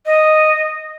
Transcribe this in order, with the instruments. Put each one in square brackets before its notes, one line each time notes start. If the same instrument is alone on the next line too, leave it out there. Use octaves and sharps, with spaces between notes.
[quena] D#5